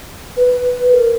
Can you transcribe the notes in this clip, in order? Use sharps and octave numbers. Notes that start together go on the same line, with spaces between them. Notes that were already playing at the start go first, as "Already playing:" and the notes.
B4
A#4